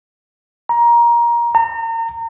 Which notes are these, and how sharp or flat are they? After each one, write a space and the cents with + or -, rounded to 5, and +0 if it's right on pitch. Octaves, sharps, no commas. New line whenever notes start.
A#5 +20
A#5 -35